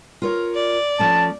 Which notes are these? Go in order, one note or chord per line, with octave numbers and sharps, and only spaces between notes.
F4 A#4 C#5
D5
F3 A3 C#4 A5